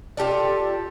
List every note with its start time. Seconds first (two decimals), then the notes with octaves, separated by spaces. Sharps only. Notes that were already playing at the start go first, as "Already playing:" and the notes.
0.17 F4 G4 A4 D5